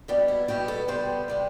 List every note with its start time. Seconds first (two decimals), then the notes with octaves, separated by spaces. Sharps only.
0.08 B2 G3 B3 D4
0.28 E4
0.48 B2 G3 B3 G4
0.68 A4
0.88 C3 G3 B3 C5
1.28 C3 G3 B3